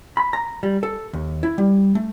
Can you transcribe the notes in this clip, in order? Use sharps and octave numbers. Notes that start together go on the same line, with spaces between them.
B5
A#5
G3
A4
D#2
E4
G3
A3